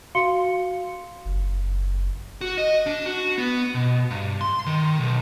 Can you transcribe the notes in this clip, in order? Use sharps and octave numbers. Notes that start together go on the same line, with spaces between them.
F#4 F5 C6 C#7 G7
F#1
F#4
D#5
D4
F#4
B3
B2
G2
C6
D#3
B1